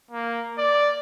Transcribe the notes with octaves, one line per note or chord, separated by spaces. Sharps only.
A#3
D5